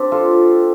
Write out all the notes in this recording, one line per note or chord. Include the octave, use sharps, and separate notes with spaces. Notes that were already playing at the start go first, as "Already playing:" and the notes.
Already playing: C4 D4 G4
F4 A4